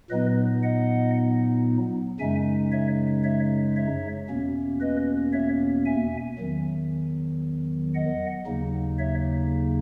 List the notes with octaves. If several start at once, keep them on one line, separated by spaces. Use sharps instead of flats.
A#2 F#3 B3 D#4 B4 D#5
D#5 F#5
F#2 C#3 G#3 D#4 E5 G#5
C#5 E5
C#5 E5
C#5 E5
E2 B2 A#3 C#4
B4 D#5
C#5 E5
E5 G#5
E2 D#3 F#3
D#5 F#5
D#2 C#3 F#3 A#3 D#4
C#5 E5